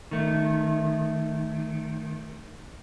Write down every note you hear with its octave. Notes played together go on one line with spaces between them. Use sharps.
D#3 A3